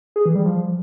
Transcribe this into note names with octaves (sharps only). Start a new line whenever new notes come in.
G#4
E3
G3
F3